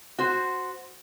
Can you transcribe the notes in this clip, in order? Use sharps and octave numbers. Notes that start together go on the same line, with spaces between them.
F#4 C5